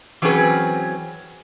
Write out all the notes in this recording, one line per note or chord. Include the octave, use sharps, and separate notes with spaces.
E3 F#3 C4 C#4 G#4 B4